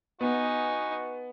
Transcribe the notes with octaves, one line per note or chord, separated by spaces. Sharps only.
B3 D#4 F#4 G#5